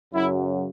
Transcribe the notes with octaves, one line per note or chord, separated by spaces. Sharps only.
F#2 C#3 F#3 E4